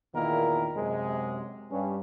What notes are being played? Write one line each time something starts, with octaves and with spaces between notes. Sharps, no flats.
E2 A#2 D#3 A#3 E4 A#4
F#2 C3 G#3
G2 C#4